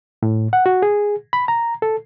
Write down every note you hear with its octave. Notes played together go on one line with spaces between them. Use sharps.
A2
F#5
F#4
G#4
B5
A#5
A4